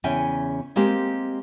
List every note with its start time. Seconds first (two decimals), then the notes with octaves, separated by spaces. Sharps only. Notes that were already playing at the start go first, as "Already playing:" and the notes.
0.04 E2 C#3 C#4 E5 G5 G#5
0.76 G#3 A#3 C4 G4